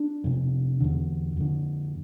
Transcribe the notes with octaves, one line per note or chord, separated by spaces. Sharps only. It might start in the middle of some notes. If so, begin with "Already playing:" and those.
Already playing: D4
F2 C3
E2 D3
F2 D3